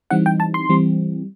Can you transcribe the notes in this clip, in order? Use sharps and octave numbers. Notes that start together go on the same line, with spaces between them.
E3 G3 C4 D#4 F#5
G5
A5
C6
E3 G3 C4